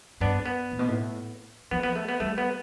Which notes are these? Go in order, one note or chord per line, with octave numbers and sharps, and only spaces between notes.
G2 B3 D4
B3
A2
B2
A2
F3 B3
B3
A3
B3
G3 A3
B3